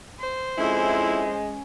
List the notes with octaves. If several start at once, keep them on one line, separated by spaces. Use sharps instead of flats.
C5
F2 G#3 C#4 E4